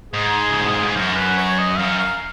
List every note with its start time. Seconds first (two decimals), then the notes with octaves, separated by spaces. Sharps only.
0.13 G#2 G#4
0.50 C#3
0.61 B2
0.73 A#2
0.85 G#2
0.96 F#2 A#4
1.16 B4
1.37 C#5
1.59 D#5
1.78 F#2 F5
1.99 F5